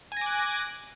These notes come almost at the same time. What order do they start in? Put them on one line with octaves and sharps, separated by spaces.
G#5 A#6 D6 F#6